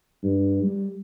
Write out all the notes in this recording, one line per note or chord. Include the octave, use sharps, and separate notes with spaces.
G2
G3